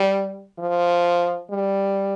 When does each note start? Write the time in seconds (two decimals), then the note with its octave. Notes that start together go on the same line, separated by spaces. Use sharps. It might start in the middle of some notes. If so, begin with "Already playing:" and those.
Already playing: G3
0.59 F3
1.51 G3